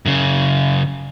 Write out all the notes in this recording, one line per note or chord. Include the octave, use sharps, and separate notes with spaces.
F#2 C#3